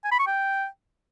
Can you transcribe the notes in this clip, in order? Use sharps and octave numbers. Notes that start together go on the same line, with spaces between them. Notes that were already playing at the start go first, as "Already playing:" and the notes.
G#5
B5
C#6
G5